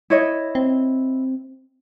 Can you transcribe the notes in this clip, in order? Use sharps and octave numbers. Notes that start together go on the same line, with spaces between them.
E4 C#5 D#5
C4